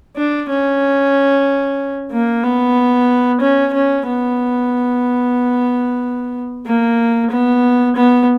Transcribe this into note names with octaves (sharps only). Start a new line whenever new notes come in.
D4
C#4
A#3
B3
C#4
C#4
B3
A#3
B3
B3